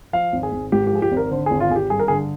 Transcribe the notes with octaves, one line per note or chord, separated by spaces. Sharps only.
F3 F5
G#1
G#4
G#1
G#2 G4
G4
F3 G#4
G4
G#1
A#4
D3 C5
G#1 G#4
F4
G#1 G#4
G4
G2 G#4
A#4
D3 G#4